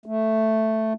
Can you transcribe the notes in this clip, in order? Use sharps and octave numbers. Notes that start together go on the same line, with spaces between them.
A3